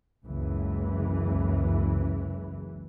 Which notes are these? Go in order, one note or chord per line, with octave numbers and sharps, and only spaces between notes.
F#1 C#2 E3